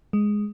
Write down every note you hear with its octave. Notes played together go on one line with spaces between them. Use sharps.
G#3